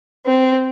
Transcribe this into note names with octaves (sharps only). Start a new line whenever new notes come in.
C4